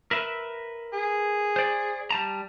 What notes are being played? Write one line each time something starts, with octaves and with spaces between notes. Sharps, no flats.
A#4 B4 E5
G#4
C5 D5
G3 A5 A#5